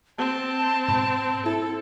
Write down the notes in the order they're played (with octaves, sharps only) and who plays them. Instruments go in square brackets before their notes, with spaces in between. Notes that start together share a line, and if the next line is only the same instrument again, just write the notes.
[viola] C4 [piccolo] A5
[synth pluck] G#2 B2 B5
[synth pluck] E4 [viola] A4